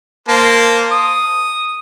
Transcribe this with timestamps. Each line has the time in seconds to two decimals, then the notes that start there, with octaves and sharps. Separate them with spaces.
0.28 A#3 C5 A5
0.92 D#6